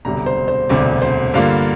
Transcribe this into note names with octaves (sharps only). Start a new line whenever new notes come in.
E1 D2 C3 G3 A#5
C5
C5
E1 D2 C3 G3 D5
C5
G2 D3 G3 A#3 F4 F5